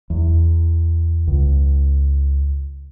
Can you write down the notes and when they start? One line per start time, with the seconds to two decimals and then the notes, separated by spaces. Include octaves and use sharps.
0.10 E2
1.27 C#2